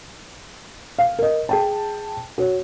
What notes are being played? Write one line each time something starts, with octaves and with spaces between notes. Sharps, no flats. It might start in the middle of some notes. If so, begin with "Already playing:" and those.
F5
A#4 D#5
G#4 G5 A5
F#4 C#5